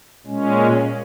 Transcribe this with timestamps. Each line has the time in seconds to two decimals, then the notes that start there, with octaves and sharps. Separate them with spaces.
0.26 A#2 G#3 C#4